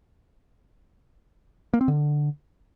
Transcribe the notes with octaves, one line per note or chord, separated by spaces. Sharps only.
A#3
C4
D3